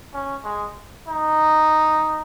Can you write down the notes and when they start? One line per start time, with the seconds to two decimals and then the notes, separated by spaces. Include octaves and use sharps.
0.14 C#4
0.45 G#3
1.08 D#4